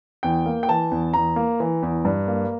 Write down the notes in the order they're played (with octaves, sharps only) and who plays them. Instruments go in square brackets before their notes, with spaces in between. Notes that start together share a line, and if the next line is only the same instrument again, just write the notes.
[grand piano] E2 G5
A#3
G5
E3 A5
E2
E2 A#5
A#3
E3
E2
G2
A#3